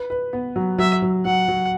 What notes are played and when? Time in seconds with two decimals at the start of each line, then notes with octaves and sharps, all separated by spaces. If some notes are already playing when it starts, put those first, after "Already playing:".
Already playing: B4
0.10 B4
0.33 B3
0.56 F#3
0.78 F#3 E5
1.02 F#3
1.25 F#3 F#5
1.48 F#3